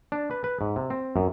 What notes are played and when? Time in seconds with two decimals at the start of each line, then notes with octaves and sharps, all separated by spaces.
0.12 D4
0.31 B4
0.44 B4
0.61 G#2
0.76 C3
0.90 C4
1.16 F#2